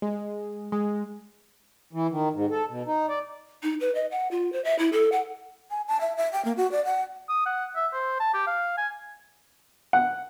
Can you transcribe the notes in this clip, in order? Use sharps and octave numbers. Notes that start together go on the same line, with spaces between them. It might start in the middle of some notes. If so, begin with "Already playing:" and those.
G#3
G#3
E3
D#3
G#2
A4
B2
D#4
D5
D#4
B4
D#5
F#5
F4
C5
E5
E4
A4
F#5
G#5
A5
E5
E5
G5
A#3
F#4
D5
F#5
D#6
F#5
E5
C5
A5
G4
F5
G#5
F#5